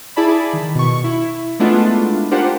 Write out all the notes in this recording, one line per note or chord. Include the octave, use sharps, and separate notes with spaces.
E4 G#4 D5 A5 B5
D#3
B2 C#6
E4
G#3 A3 B3 D4 E4 F4
D4 F4 G4 A#4 C5 F#5